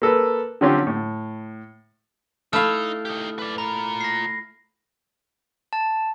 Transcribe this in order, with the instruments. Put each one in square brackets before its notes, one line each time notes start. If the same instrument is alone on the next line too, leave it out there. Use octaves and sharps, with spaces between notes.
[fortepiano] A#3 A4 B4
D3 F#3 C4 C#4 F4 G4
A2
[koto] A3 E4 F5 [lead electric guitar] D#4 [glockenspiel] F6
[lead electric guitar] D#4 G4
B4 D5
[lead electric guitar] F4 A#5 [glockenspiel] B5
[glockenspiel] A#6 C7
[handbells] A5